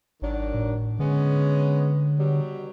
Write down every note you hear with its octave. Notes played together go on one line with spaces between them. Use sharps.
G#1 D#3 F#3 D4
A2
D3 G#3 B3 C#4
B2 F#3 G3